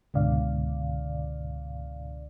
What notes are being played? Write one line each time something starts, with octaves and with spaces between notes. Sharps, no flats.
C#2 G#2 B2 D3 D5 F5